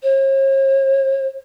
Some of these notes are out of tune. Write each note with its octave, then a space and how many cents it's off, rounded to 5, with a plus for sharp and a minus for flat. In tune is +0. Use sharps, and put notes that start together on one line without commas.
C#5 -45